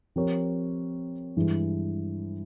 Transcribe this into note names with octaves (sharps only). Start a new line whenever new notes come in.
F3 C4 G4 A#4 C#5
G2 E3 G#3